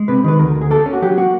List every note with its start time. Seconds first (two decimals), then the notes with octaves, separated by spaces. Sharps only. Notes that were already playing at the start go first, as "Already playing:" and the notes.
Already playing: G#3
0.08 C3 B4
0.24 D#3 B4
0.39 D2 A#4
0.55 D2
0.61 G#4
0.71 A#3 A4
0.86 C#4
0.93 F#4
1.02 F#3 G4
1.17 A#3 F#4